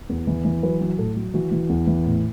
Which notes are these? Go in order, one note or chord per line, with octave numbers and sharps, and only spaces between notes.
E2
E3
E3
F#3 B4
F#3
A2 A4
F#3
E3 F#4
E3
E2
E3
A2